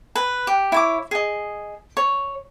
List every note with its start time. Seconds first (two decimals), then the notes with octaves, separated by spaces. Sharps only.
0.15 B4
0.47 G4
0.72 E4 C#5 D6
1.11 G#4 D#5
1.97 C#5